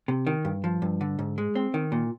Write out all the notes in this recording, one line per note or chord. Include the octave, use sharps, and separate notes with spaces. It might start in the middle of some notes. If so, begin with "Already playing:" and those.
C3
D#3
G2
F3
G2
D3
G#2
G#3
C4
D#3
A#2